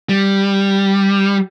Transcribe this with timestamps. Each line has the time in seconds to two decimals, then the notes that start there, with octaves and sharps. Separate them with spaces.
0.09 G3